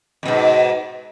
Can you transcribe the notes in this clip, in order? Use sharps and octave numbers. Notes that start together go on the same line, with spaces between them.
F2 G#2 B2